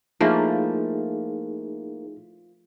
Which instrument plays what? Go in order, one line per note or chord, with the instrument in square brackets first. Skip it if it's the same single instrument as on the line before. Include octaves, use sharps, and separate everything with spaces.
[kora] F3 A3 E4 [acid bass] A#3 [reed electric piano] D#4 G#4